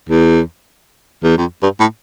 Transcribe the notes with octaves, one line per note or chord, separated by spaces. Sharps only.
E2
E2
F2
G2
A2